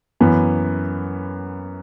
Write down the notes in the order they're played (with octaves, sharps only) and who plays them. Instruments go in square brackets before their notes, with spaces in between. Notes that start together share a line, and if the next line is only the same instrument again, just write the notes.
[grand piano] F#2 E3 B3